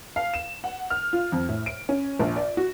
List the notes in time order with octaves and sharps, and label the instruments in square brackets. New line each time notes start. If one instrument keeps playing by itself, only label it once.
[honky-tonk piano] F5
E7
F#5
F6
F4
F2
A2
D7
C#4
A#1
D5
F#4